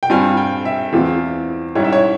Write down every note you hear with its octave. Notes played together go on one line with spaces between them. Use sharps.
G5
G2 G3 C4 F4 G#5
G5
E5
E2 E3 G#3 C4 F4
G#2 G3 C#4 E4 C#5
E5
C#5